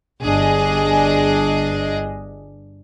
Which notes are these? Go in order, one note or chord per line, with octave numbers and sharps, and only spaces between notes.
G1 G2 D4 G#4 D#5